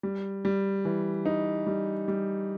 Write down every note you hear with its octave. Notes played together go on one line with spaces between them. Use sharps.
G3
G3
E3
D#4
G3
G3